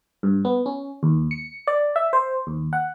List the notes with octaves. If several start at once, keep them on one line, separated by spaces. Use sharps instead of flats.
G2
B3
C#4
D#2
C#7
D5
E5
C5
D#2
F#5